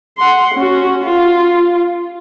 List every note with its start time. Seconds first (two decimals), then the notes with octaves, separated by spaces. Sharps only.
0.18 F#5 C6
0.55 C#4 F#4
1.04 F4